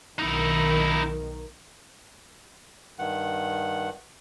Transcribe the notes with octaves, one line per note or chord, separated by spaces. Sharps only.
B1 D#3 D#4 E4
G2 D#3 F#5